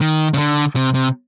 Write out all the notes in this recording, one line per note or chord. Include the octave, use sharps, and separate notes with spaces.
D#3
C#3
D3
C3
C3